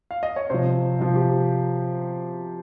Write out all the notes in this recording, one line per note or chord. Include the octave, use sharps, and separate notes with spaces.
F5
D#5
C#5
C3 F3 C5
C3 F3
G4